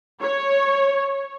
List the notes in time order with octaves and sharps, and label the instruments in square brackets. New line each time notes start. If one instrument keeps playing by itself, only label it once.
[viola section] C#5